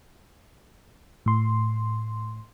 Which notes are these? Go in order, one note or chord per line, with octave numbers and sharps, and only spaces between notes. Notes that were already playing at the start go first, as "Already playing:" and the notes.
A2 C6